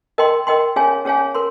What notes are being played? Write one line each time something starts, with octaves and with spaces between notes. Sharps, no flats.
A#4 D#5 G5 C6
A#4 D#5 G5 C6
C#4 G#4 C#5 F5 G#5
C#4 G#4 C#5 F5 G#5
A#4 C6